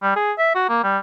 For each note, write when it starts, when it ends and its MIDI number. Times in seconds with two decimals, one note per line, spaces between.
0.03 0.12 55
0.16 0.32 68
0.38 0.52 76
0.55 0.65 66
0.69 0.79 58
0.83 0.98 55